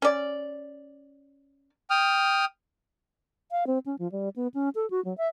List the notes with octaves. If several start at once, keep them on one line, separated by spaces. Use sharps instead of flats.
C#4 D5
G5 D#6 F6
F5
C4
C#4
F3
G3
B3
C#4
A4
F#4
F#3
E5